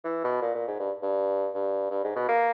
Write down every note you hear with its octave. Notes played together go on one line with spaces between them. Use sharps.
E3
B2
A#2
A#2
G#2
G2
G2
G2
G2
G#2
B2
A#3